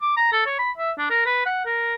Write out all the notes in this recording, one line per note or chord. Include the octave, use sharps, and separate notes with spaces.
D6
A#5
A4
C#5
B5
E5
D4
A#4
B4
F#5
A#4